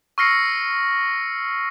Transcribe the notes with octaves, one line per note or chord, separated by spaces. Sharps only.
C#6 E6 F6 A#6 C7 C#7